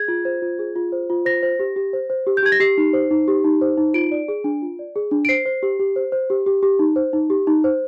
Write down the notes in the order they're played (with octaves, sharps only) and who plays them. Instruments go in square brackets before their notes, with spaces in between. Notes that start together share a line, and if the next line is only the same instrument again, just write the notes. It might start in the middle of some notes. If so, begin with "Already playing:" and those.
Already playing: [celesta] G#4 G#6
F4
C5
F4
G#4
F4
C5
F4
C5 A#6
C5
G4
G4
C5
C5
G4
G6
G4 G#6
A#6
G4 C7
D#4
C5
D#4
G4
D#4
C5
D#4
F4 D7
D5
G#4
D4
F4
D5
G#4
D4
D7
C5 C7
C5
G4
G4
C5
C5
G4
G4
G4
D#4
C5
D#4
G4
D#4
C5